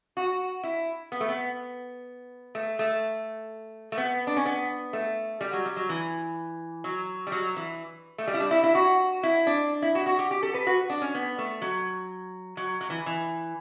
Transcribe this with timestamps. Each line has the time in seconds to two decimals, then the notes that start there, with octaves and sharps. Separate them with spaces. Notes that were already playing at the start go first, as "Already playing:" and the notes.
0.17 F#4
0.63 E4
1.12 B3
1.21 A3
1.28 B3
2.55 A3
2.79 A3
3.92 A3
3.97 B3
4.27 D4
4.37 C#4
4.46 B3
4.93 A3
5.41 G3
5.53 F#3
5.66 G3
5.76 F#3
5.89 E3
6.84 F#3
7.27 G3
7.32 F#3
7.57 E3
8.18 A3
8.27 G3
8.34 E4
8.40 D4
8.51 E4
8.64 E4
8.75 F#4
9.23 E4
9.47 D4
9.82 E4
9.95 F#4
10.06 F#4
10.19 G4
10.31 G4
10.43 A4
10.54 B4
10.67 F#4
10.90 D4
11.02 C#4
11.15 B3
11.38 A3
11.62 F#3
12.57 F#3
12.81 F#3
12.90 E3
13.06 E3